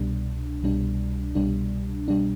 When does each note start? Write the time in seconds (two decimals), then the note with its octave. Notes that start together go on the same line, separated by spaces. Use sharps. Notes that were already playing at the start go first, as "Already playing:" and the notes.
Already playing: C2 B2 G3 D4
0.63 C2 B2 G3 D4
1.35 C2 B2 G3 D4
2.08 B2 G3 D4